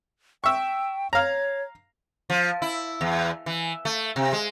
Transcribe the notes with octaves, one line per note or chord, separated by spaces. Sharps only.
E5 G5 C#6
C#5 F5 A#5
F3
E4
E2
E3
A3
C3
G#3